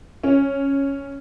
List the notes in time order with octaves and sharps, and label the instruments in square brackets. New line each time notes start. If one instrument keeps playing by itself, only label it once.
[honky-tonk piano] C#4